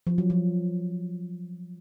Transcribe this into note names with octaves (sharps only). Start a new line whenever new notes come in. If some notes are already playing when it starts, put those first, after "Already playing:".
F3
F#3
F3